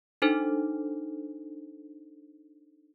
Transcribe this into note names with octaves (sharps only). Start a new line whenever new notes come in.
D4 D#4 A4 C5